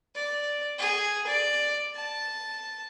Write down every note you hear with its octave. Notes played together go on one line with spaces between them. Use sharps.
D5
G#4
D5
A5